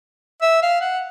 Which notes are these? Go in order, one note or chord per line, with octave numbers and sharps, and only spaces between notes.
E5
F5
F#5